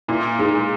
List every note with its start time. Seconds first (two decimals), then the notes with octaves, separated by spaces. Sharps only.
0.08 A#2 E4
0.39 G#3 D#4